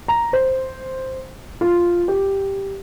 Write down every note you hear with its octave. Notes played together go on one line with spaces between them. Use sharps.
A#5
C5
F4
G4